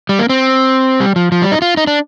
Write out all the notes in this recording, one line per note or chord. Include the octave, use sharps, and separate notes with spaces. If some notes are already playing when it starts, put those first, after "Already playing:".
G3
A#3
C4
G3
F3
F3
G3
D#4
F4
D#4
D4